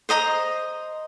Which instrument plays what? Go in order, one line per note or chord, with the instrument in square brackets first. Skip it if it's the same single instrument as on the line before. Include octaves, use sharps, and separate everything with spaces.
[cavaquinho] C5 D#5 A#5 D#6